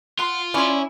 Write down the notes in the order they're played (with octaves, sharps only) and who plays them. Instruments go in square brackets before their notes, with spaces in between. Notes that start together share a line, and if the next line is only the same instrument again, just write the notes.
[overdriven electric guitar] F4 [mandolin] F#5 C6
[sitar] C#4 E4 [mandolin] D5 C6